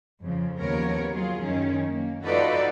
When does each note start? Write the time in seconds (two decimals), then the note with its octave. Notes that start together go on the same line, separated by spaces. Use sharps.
0.22 F2 C#3 F3
0.59 D#2 C#3 F3 B3 A#4 C#5
1.12 F#3 F4 G#4
1.42 F#2 D#3 C#4
1.87 A#3
2.24 D#4 F4 F#4 A4 B4 D5